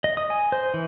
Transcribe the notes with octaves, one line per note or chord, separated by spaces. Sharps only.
D#5
D#6
G#5
C5
E3